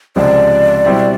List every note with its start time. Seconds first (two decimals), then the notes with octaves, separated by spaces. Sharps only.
0.16 C#2 C3 F3 G#3 D5
0.85 B2 G3 C4 E4